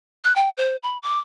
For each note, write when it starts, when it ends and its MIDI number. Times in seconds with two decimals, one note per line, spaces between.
0.24 0.35 90
0.36 0.49 79
0.57 0.76 72
0.83 0.98 83
1.03 1.19 86